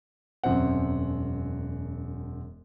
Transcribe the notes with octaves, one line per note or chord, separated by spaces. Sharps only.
E1 F#2 C4 F#5